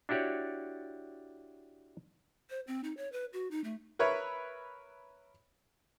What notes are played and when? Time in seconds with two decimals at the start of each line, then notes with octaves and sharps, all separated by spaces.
0.09 D4 E4 F#4 G4 C#5 D5
2.50 C5
2.67 C4
2.84 D#4
2.97 C#5
3.12 B4
3.33 F#4
3.51 D#4
3.64 A3
3.99 A#4 B4 C#5 E5